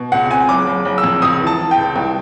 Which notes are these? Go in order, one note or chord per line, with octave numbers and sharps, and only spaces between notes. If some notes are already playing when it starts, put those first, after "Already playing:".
Already playing: B2
C#2 F#5
C4 G#5
F#1 D6
F#1
F#1
E6
F2
C#2 D#6
E3
A5
E3
G5
C#2
C2